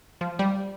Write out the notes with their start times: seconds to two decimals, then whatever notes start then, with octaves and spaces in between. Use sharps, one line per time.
0.21 F3
0.39 G3